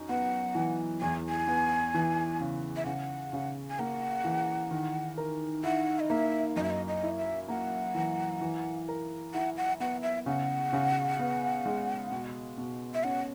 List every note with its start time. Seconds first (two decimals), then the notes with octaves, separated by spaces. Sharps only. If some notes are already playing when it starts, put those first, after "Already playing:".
Already playing: F#2 D#4
0.09 B3 F#5
0.55 E3
1.01 E2 G#5
1.29 G#5
1.47 B3
1.94 E3
2.41 C#3
2.76 E5
2.86 C#3 F#5
3.33 C#3
3.70 G#5
3.79 A#3 F#5
4.25 E3
4.71 D#3
5.18 A#4
5.64 E4 F#5
6.00 D#5
6.10 A#3 E5
6.56 F#2 D#5
6.64 E5
6.70 D#5
6.88 D#5
7.03 E4
7.18 E5
7.48 A#3 F#5
7.95 E3
8.41 E3
8.88 A#4
9.34 E4 F#5
9.57 F#5
9.80 B3 F#5
10.03 E5
10.26 C#3 F#5
10.73 C#3
11.19 B3
11.66 G#3
12.11 B2
12.58 B2
12.94 E5
13.04 C#4 F#5